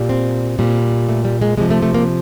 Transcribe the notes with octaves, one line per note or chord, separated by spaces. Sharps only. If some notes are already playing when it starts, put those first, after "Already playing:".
Already playing: A#2 G3
C4
A#2 G3
A3
G3
G#3
C3 F3 G#3
A3
A3
A#3